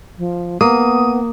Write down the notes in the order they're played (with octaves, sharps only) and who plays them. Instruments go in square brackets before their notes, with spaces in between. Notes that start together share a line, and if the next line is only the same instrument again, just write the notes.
[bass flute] F3
[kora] A#3 [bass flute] B3 [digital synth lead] D#6